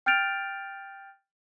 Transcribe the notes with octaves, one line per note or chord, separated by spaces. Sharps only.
G5 F6 G6 A6 D7 F7